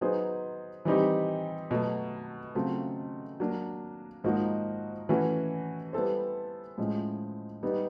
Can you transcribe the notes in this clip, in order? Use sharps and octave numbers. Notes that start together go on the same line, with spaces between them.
F#3 B3 D#4 G#4 C5
E3 G3 C4 D#4 G4
B2 F#3 A3
C#3 F#3 A3 C4 F4
F#3 A#3 D4
G#2 F3 A#3 D#4 F#4
E3 A3 C#4 F#4
G3 B3 E4 A4 C5
A2 F3 G#3 C#4
G3 B3 D#4